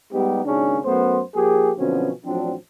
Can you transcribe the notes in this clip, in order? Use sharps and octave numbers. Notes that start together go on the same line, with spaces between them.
G3 G#3 B3 D#4 G4
G#1 D#2 C#3 C#4 D4
F#2 A3 B3 C5
F3 A#3 G4 G#4
B2 D3 F3 F#3 C4 C#4
A1 F3 F#3 C4 D4